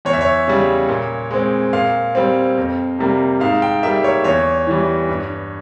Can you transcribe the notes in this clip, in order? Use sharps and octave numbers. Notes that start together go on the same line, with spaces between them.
E2 C#5
E5
C#5
C#3 G3
A#2
G#3 C4
A#2 F5
G3 C4
F2
C3 G3 A#3
G#2 F5
G5
G3 A#3 E5
C#5
E2 C#5
E3 G3
G2